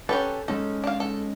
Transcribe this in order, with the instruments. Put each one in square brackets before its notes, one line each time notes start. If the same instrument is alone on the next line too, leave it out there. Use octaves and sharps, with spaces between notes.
[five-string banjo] C#4 G4 B4 [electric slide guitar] A4
[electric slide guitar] G#3 C#4 D#4 [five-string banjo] A4
[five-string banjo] D4 F5
A4